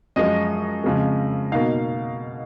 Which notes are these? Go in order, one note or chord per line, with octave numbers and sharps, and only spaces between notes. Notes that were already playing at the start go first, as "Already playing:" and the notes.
F#2 F3 G#3 D#5
F2 C#3 F3 G#3
B2 A#3 D#4 F5